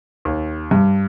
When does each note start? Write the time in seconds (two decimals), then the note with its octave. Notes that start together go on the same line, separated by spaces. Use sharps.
0.25 D#2
0.71 G2 G3